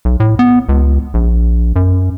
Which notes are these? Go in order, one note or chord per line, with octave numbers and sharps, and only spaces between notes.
B1
A2
B3
C#2
A#1
F#2